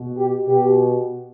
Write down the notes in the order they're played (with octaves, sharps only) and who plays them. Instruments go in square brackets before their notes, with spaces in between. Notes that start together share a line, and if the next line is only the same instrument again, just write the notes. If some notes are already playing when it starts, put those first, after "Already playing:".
Already playing: [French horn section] B2
G4
B2 G4